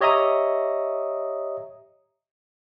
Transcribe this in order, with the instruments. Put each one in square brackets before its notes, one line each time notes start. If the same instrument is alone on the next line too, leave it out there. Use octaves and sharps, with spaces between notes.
[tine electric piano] G4 C#5 D#5 E5 A#5 D#6